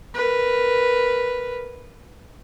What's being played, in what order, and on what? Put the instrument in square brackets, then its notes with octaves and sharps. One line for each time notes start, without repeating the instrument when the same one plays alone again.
[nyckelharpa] A#4 B4